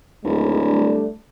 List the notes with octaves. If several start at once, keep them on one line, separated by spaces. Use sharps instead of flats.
D1 D#2 G#3
G3 A3 D4